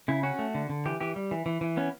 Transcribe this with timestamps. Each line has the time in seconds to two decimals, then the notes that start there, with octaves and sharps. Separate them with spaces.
0.08 C#3 E4
0.23 C#4 F#4
0.39 A3
0.55 D3
0.70 D3
0.85 E3 G4
1.01 E3 G4
1.16 G3
1.31 E3
1.46 E3
1.61 E3
1.77 B3 C#4